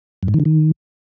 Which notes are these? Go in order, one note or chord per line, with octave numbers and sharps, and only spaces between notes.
F#2
G#2
D#3
D3
D#3